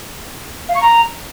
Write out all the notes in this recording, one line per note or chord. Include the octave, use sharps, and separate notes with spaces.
F5
C#6
A#5